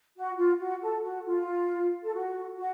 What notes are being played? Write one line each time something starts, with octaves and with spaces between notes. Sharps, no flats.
F#4
F4
F#4
A4
F#4
F4
A4
F#4
F#4